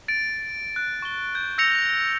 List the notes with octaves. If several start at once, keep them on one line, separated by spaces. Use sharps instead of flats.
A6 D7
F#6
C#6 G7
G6
E6 G6 A#6 C#7 F7